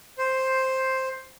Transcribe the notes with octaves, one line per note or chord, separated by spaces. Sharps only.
C5